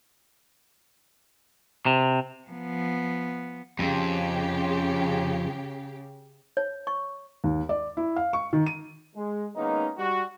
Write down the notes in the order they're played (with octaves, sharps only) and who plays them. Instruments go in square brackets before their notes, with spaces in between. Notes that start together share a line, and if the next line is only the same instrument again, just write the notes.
[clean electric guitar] C3
[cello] F3 B3
[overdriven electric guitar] F2 [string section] C#3 G4
[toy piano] C#5
C#6
[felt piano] D#2
D5
E4
F5
C#6
D#3
D#7
[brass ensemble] G#3
D#3 G#3 A#3 B3 C#4 D#4
G3 F#4